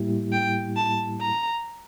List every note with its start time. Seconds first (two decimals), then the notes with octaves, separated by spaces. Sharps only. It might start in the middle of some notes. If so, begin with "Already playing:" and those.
Already playing: A2 G3 A#3 E4 G4
0.32 G5
0.76 A5
1.21 A#5